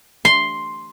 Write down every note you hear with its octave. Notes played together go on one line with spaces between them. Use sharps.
C6